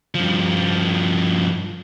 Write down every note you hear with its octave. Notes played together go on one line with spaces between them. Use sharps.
G2 F3